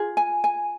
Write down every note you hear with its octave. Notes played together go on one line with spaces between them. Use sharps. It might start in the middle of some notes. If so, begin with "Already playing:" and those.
Already playing: F4 G#4
G#5
G#5